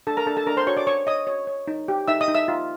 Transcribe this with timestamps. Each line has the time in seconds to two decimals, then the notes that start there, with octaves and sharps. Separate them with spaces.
0.07 D4 A4 A5
0.17 A#4 A#5
0.26 D4 A4 A5
0.37 A4 A5
0.47 D4 A#4 A#5
0.57 C5 C6
0.67 F#4 C#5 C#6
0.77 D5 D6
0.87 C#5 C#6
1.07 C#5 D#5 D#6
1.27 C#5
1.47 C#5
1.68 D#4
1.88 G4
2.08 D#4 E5 E6
2.21 D#5 D#6
2.28 D#4
2.35 E5 E6
2.48 F4